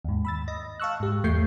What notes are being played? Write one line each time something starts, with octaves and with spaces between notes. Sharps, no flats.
D#2 G#2
B5 E6 A6
D#5 A#6
F5 A5 C#6 E6 F#6
G#2 G4
E2 A3 C#6 G6 C7